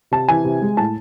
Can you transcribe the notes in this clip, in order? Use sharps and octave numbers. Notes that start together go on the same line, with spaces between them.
C3 A5
E3 G#5
C3
G#3
A2 A5